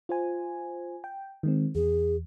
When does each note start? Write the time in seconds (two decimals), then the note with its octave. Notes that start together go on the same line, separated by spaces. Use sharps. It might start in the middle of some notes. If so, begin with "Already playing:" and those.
0.09 F4 C5 G#5
1.04 G5
1.43 D#3 G#3 C4
1.75 E2 G#4